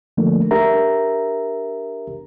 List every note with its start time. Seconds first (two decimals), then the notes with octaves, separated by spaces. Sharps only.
0.17 D3 F3 A3 A#3 D4
0.51 D4 G4 A#4 E5 A#5